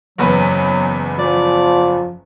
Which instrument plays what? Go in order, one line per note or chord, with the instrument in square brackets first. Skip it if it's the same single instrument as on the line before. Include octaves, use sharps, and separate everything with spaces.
[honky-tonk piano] F#1 E2 B4 [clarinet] F#3
[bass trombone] F3 [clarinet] D5